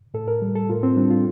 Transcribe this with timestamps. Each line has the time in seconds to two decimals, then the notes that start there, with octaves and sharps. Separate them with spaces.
0.14 A2 A4
0.28 A#4
0.42 G3
0.56 A4
0.69 A2 F4
0.83 C4
0.97 G3 D4
1.10 F4